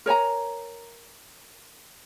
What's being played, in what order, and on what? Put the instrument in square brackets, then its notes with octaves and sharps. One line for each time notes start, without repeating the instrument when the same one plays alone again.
[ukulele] A#4 C#5 G#5 A#5